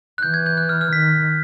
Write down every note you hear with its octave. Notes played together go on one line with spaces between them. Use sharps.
F#6
E3 G6
G#6
G6
F#6
F6
F6
D#3 B6